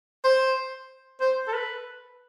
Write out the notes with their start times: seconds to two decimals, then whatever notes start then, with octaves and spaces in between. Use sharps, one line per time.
0.24 C5
1.20 C5
1.48 A4
1.53 B4